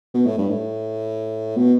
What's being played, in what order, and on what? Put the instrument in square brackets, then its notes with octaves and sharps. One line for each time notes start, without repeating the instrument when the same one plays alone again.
[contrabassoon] B2
A2
G2
A2
B2